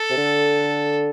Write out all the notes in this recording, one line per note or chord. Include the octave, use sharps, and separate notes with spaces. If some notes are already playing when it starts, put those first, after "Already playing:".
Already playing: A4
C3
D3